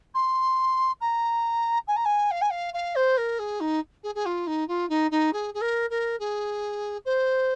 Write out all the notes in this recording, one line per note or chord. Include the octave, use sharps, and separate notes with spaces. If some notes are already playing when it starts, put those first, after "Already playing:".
C6
A#5
G#5
A#5
G#5
F5
G#5
F5
F5
C5
A#4
G#4
D#4
G#4
G#4
F4
D#4
F4
D#4
D#4
G#4
G#4
A#4
A#4
G#4
C5